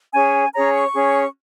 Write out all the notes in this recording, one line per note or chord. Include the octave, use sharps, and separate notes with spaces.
C#4 G#4 C#5 G#5
C#4 G#4 C#5 A#5
C#6
C#4 G#4 C#5